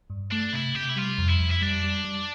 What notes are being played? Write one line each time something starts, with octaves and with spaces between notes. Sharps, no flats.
G2
A3 D4
C3 E4
C3 G4
E4
G3 F4
F2
E4
F2
E4
G3 D4
G3
G3